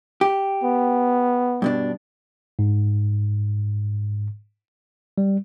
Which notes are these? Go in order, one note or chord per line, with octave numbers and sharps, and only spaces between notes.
G4
B3
G2 B2 D4
G#2
G3